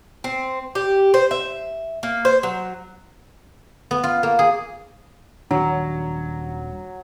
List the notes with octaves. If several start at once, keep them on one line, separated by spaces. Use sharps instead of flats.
C4
G4
C5
E5
A#3
C5
F#3
B3
F4
A#3
G#4
D#1 D#3 F#3 D4